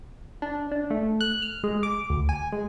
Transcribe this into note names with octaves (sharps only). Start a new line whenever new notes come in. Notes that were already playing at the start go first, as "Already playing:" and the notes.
D4
D4
A3
F#6
F6
G#3
D6
D2
G#5
G#3